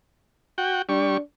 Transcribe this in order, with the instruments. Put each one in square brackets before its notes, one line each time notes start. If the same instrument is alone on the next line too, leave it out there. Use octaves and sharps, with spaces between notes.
[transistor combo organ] F#4 G5
[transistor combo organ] G3 C#6 [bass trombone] D4